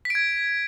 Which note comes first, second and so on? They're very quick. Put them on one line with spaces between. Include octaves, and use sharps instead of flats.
B6 D7 G#6